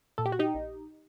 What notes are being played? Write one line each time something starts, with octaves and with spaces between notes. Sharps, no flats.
A#2 A4
G4
F#4
D#4 G4
A#1